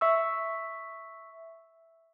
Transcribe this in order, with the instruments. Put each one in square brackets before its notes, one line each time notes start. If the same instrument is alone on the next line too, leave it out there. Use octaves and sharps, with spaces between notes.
[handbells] E5 C#6 E6